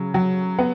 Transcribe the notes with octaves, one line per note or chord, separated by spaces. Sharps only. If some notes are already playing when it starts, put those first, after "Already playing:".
Already playing: C#3 F#3
F#3
B3